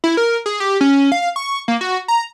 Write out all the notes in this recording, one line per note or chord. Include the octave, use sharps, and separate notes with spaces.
E4
A#4
G#4
G4
C#4
F5
C#6
A#3
F#4
A#5